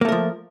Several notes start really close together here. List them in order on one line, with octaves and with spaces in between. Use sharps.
A#3 A3 A#4 F3